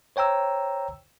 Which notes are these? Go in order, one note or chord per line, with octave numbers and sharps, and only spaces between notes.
C5 C#5 G5 A#5 E6